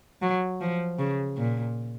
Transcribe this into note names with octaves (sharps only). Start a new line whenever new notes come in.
F#3
F3
C#3
A#2